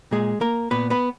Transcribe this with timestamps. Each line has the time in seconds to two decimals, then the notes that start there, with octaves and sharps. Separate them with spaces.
0.11 A#2 G#3 G#4
0.41 A#3 A#4
0.71 A#2 B3 B4
0.90 B3 B4